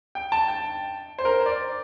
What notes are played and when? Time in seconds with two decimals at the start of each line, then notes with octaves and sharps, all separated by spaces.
0.15 G5
0.32 A5
0.48 G5
1.18 C5
1.25 A#4
1.40 C5
1.46 D5